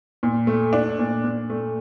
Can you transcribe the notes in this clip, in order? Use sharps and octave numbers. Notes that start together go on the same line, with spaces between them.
A#2
A3
D4
A#2
A#2
A3